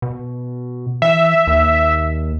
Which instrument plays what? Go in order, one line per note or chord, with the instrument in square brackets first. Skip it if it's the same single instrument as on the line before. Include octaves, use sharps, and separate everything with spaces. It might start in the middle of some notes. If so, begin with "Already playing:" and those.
[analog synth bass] B2
[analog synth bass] E3 [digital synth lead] E5
[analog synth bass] D#2